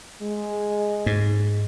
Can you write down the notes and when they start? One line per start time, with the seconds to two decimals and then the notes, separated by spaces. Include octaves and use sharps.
0.22 G#3
1.06 G#2